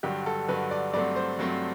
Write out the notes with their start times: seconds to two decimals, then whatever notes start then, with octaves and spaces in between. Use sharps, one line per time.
0.03 G2 D3 F#3 G4
0.26 A4
0.48 G2 D3 F#3 B4
0.71 D5
0.94 G2 F#3 A3 C4 D5
1.16 C5
1.39 G2 F#3 A3 C4